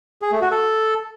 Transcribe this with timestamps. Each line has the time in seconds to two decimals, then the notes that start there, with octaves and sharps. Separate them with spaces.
0.22 G#4
0.32 A3
0.41 F#4
0.51 A4